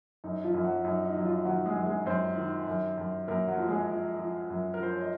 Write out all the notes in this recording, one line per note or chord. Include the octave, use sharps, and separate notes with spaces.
F#2 D#4
F3 F4
F#2
F#3 F#4
F#2 D#4
D#4
F#3
F3 F4
D#3 F#3 F#4
G#3 G#4
F#2
G#3 G#4
F#2 C4 C5
D#3
F#2
F#2
F#2 A#3 A#4
F#3 F#4
F3
G#3 G#4
F3
F3
F#2
A#4
F3 C5
C#5
D#5